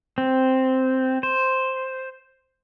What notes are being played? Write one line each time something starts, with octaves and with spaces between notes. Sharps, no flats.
C4
C5